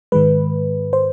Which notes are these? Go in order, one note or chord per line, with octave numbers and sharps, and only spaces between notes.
G#2 D#3 G#3 B4
C5